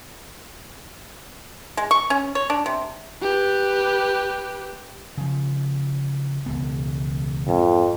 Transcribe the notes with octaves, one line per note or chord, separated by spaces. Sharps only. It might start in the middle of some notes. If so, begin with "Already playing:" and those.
G#3
C#6
C#4
C#5
D4
C3
G4 B4
C#3 F3
E1 C#2 B3
F2 G#2